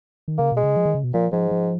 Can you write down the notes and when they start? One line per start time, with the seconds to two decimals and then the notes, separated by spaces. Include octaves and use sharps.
0.28 D#3
0.38 C#3 A#3
0.52 B2
0.57 G#3
0.64 C#3
0.76 F3
0.85 D#3
0.95 C#3
1.04 B2
1.14 A#2 F3
1.32 G#2 F3
1.51 F3